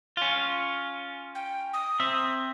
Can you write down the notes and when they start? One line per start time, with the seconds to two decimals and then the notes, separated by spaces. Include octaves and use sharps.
0.17 C#4 F4
1.35 G5
1.73 D#6
2.00 C4 E5